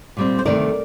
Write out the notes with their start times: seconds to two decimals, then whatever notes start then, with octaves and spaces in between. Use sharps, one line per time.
0.17 A#2 G3 C4
0.39 C5
0.46 D2 C3 D#3 A3 A#4 D5